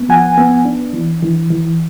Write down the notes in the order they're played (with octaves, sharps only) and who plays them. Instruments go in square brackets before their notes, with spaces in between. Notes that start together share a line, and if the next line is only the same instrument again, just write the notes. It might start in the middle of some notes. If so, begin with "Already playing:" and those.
Already playing: [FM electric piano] B3
F3 F#5 G#5
B3
D4
E3
E3
E3